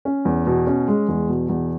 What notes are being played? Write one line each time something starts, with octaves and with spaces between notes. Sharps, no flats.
C#4
E2
B2
C#4
G#3
E2
B2
E2